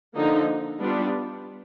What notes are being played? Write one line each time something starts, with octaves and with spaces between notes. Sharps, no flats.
D3 F3 A#3 D#4
G3 B3 D4 F4